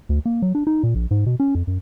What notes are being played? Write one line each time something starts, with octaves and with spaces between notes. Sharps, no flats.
D2
A#3
F#3
D4
D#4
A#2
A#1
G#2
B2
C#4
F2
F#2